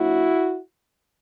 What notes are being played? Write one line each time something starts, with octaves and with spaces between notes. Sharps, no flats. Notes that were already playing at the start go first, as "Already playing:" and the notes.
Already playing: A#2 F#3 A#3 D4 E4 F#4